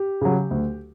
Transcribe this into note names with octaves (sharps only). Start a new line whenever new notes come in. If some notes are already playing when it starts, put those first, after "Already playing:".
Already playing: G4
C#3 F#3
D2